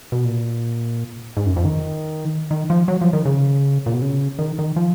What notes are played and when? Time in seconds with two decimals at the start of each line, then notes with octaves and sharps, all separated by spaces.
0.12 B2
0.25 A#2
1.37 G#2
1.46 F#2
1.56 F2
1.65 D#3
2.51 D#3
2.70 F3
2.88 F#3
3.01 F3
3.13 D#3
3.25 C#3
3.86 A#2
3.93 B2
4.02 C#3
4.39 D#3
4.59 D#3
4.76 F3